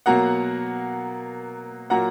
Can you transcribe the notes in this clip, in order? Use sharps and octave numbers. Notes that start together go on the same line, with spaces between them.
B2 F#3 A#3 F#5 A#5
A#2 F#3 A#3 F#5 A#5